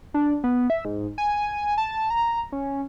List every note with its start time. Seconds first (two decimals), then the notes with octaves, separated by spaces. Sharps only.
0.14 D4
0.44 B3
0.70 E5
0.85 G#2
1.18 G#5
1.78 A5
2.10 A#5
2.52 C#4